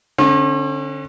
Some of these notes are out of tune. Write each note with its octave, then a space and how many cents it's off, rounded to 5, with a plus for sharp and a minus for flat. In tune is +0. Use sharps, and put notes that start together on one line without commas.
D3 +0 C#4 -45